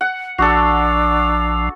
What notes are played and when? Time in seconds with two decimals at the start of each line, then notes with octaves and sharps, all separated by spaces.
0.01 F#5
0.39 A#1 F3 D4 F#4 A4 D6 E6